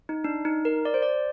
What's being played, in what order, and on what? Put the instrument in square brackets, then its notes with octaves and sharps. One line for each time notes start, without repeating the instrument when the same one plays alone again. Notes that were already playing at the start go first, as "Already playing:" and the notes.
[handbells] D#4
D4
D#4
A#4
D5
C5
D5